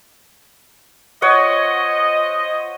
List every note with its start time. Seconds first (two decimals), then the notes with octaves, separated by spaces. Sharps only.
1.22 F4 C5 C#5 D#5 F#5